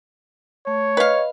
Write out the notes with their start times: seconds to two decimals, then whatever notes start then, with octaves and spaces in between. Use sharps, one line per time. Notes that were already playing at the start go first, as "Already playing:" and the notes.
0.67 A3 C#5
0.97 B4 D#5 F5